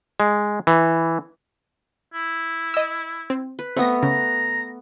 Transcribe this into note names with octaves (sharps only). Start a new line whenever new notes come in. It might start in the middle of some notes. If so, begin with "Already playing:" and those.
G#3
E3
E4
D#5 E6
C4
B4
A3 B3 C4 A#6
C#3 A#5